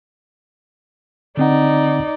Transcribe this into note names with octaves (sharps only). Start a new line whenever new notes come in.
D3 C4 D#4 D5 F#5